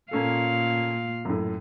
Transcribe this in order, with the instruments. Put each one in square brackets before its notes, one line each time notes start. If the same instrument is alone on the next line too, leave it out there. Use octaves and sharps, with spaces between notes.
[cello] A#2 F5 [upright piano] A#3 C#4 A4
[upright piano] F#2 A2